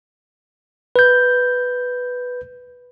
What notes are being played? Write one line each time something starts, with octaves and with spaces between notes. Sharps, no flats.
B4 G6